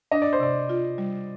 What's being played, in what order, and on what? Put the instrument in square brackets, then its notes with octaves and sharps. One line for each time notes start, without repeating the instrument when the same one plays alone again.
[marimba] D4 [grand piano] D#5
[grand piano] D5
C5
[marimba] C3 [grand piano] D5
[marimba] F4
G3